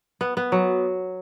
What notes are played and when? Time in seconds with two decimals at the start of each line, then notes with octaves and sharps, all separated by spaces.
0.21 B3
0.37 B3
0.52 F#3